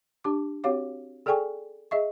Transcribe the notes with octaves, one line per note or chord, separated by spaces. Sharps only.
D4 G4 D6
C4 F#4 G4 C#5 F5 D6
G#4 A4 D5 G5 G#5 C#6
G#4 D#5 E5 C#6